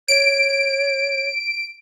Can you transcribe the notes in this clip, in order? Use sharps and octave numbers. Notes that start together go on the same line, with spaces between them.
C#5 D7